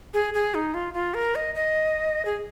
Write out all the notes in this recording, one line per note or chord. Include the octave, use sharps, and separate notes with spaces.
G#4
G#4
D#4
F4
F4
A#4
D#5
D#5
G#4